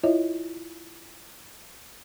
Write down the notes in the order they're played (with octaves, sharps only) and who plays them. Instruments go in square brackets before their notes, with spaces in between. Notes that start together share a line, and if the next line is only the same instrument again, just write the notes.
[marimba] E4 F4 C#5 D#5 E5